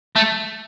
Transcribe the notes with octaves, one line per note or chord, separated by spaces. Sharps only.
A3